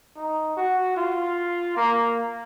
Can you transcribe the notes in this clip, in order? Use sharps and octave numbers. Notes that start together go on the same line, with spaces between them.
D#4
F#4
F4
A#3